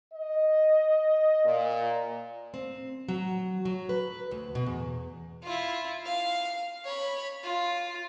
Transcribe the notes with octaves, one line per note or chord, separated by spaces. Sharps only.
D#5
A#2
C4
F#3
F#3
B4
D2
B2
E2
E4 F4
F5
C#5 B5
F4